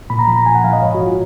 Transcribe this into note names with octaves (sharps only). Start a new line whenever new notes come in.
A#2 B5
A#5
F3 B5
A#5
A#2 G#5
F#5
F3 F5
D#5
G#2 C#5
F#4
F3
F4